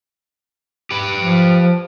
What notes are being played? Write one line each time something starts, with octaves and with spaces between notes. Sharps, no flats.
G4 B4
F3